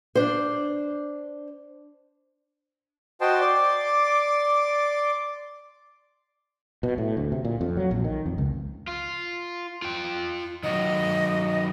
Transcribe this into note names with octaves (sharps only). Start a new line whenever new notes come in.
D4 C5
F#4 C5 D#5 G5 A5 C6
D5 C6 D6
B2
A2
D2
C3
A#2
F2
F#3
A#1
D#3
F2
C#2
F4
F4 G5
D#3 F#3 D#5